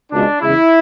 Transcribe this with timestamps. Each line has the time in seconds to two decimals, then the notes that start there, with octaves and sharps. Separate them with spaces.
0.12 C#2 B2 G#3 D4
0.41 E2 C#3 G#3 E4